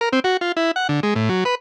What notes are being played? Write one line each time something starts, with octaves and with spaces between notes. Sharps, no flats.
A#4
C4
F#4
F4
E4
F#5
D3
G#3
A2
F#3
B4